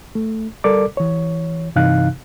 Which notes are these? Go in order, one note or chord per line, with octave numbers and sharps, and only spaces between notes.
A3
G3 A4 A#4 D5 D6
E3 C#5
G2 C3 E3 D#4 F5 F#6